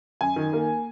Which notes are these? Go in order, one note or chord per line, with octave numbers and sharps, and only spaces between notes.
F#2 G#5
D#3
A#3